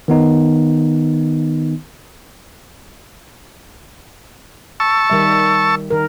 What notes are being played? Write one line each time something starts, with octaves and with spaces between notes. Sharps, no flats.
D#3 B3 D#4
A5 C#6 E6
D#3 G3 E5
D#3 A#4